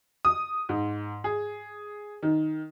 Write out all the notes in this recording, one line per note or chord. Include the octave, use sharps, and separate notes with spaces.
D#6
G#2
G#4
D#3